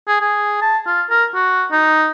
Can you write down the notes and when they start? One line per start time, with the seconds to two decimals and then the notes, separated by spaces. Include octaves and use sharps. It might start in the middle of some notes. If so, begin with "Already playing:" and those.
0.08 G#4
0.21 G#4
0.62 A5
0.87 F4
1.10 A#4
1.35 F#4
1.72 D#4